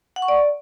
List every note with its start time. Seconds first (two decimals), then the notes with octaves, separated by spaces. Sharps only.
0.16 F#5
0.22 C#6
0.28 D5